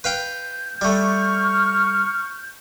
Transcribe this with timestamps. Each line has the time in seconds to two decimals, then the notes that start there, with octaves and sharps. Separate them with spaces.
0.04 B4 F5 G5 G6
0.81 G3 A3 C#6 F6